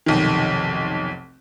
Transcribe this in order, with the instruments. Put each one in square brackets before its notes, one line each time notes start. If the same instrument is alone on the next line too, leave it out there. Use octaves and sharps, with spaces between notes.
[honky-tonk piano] F1 B1 D#3